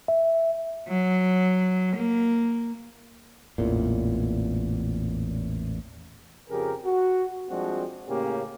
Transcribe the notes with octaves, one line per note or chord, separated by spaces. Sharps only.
E5
F#3
A#3
A1 E2 A#2
F2 C#3 G4 G#4 A#4
F#4
F3 G3 G#3 C4 D4 F#4
A2 C#3 A#3 C#4 G4